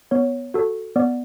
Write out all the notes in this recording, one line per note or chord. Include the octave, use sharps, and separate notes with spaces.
B3 C#5
F#4 A4
B3 D5